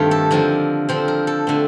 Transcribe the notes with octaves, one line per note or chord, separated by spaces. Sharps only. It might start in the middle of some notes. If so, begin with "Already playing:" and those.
Already playing: G2 D#3 A3 C4 D#4 F4 G4
A4
D3 F3 C4 A#4
D3 F3 C4 C5
A#4
A4
D3 A3 C4